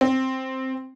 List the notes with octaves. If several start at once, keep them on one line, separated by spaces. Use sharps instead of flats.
C4